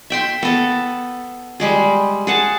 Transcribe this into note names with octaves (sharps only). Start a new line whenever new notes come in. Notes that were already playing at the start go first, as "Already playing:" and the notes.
E5 G5 C6
B3 A4
G3 G#3 G#4
G#4 F#5 A5